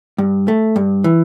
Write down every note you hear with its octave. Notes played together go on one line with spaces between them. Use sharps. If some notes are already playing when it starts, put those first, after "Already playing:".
G2
A3
G2
E3